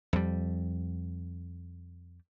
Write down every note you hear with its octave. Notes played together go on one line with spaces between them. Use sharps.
F2 G3